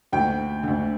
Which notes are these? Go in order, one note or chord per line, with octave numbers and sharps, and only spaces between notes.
D2 D3 G5
D2 D3